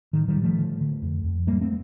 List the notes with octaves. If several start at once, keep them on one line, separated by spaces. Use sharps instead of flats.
A2 D#3
D#3 G3
A2
F3 A3
D3
D3
F2
F2
A2 G3 A#3
A3 C4